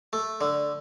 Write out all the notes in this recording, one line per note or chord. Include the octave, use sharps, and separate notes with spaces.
A3
D3